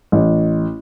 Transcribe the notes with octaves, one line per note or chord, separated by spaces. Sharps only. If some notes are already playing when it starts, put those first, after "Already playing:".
A1